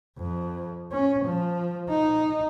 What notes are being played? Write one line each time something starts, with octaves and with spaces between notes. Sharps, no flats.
F2
C#4
F3
D#4